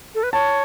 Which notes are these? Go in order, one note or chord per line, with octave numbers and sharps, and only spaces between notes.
A4
B4
C#5 A5